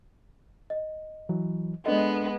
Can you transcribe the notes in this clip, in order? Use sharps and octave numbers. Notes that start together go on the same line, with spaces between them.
D#5
E3 F#3
G#3 B3 D4 A4 D#5